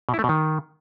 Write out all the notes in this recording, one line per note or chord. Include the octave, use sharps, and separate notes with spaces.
B2
E4
A3
B2
D#3